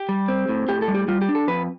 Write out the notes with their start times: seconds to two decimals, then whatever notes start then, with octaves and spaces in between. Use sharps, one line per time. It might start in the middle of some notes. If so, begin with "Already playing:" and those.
Already playing: G4
0.09 G3
0.28 C4
0.49 A2
0.69 A2 G4
0.82 A4
0.88 G3
0.95 G4
1.08 G3 F4
1.21 G4
1.29 D4
1.35 A4
1.48 F2 B4